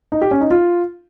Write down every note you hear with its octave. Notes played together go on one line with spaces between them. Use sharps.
D#4
G4
C#4
D#4
F4